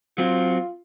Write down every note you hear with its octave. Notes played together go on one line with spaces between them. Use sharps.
F#3 C4 F4